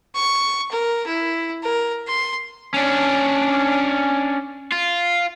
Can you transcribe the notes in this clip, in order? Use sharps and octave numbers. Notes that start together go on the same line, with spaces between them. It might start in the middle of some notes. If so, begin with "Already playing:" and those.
C#6
A#4
E4
A#4
C6
C#4 D4
F4